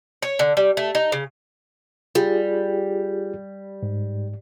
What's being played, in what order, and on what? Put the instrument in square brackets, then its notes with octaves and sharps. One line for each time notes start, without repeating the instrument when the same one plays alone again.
[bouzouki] C#5
D3
G3
A3
D#4
C#3
[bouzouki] G3 [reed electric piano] F4 G4 G#4
[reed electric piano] G#2